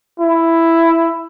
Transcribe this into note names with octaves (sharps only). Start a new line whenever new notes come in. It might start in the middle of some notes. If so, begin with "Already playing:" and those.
E4